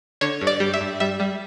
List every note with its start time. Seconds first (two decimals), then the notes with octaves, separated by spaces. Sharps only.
0.21 D3 C#5
0.41 G2
0.47 D5
0.60 G3
0.74 E5
0.81 G2
1.00 G3 E5
1.20 G3